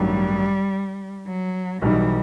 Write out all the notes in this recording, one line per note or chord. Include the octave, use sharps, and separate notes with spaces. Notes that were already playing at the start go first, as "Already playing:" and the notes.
Already playing: A1 G2 D#3 F#3 G3
F#3
B1 B2 E3 G3 D#4